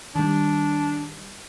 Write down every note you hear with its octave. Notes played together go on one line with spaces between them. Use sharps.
D#3 G3 D4